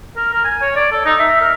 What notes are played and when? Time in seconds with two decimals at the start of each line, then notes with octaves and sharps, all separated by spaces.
0.17 A#4
0.33 A#4
0.44 G#5
0.62 C#5
0.76 D5
0.92 A4
1.06 D#4
1.19 E5
1.41 A#4